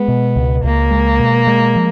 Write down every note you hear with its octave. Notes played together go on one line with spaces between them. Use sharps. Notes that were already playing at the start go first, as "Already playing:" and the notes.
Already playing: G#3 B3
B2
C#2
C#2 A#3
G#3
B2
G#3
F3